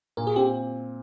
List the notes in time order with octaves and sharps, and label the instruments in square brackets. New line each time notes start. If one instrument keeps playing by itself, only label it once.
[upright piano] A#2 [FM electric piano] A#4
[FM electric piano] G#4
[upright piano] C4 [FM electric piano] G4